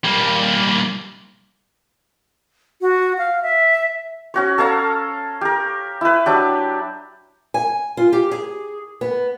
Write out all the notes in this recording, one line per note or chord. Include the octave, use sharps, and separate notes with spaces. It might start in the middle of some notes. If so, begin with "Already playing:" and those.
G3 A#3
F#4
F5
E5
C#4 F#4 C#5
A4 C#5 F5 A#5
G4 A#4
E4 B4
F#3 D4 G4
G#5
F4
G4
G#4
B3